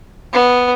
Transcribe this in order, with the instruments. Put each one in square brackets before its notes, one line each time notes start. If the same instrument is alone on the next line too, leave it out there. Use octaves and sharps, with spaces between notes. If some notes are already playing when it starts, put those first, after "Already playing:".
[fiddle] B3